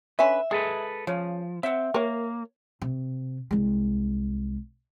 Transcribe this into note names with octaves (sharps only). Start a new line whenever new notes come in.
D3 C#4 B4 E5
G#3 G#4 A4 B4
C#3 F3
C4 E5 F#5
A#3 A#4 C#5
C3
C2 G#3